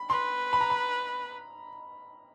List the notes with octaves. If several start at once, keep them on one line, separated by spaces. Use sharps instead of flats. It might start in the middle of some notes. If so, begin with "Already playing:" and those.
Already playing: B5
B4 C6
B5
A#5
B5